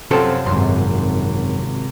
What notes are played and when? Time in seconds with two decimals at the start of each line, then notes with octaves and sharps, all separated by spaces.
0.11 F#2 C3 F3 C4 A4 C#5 F5 A5
0.46 G#1 F#2 D#3 C6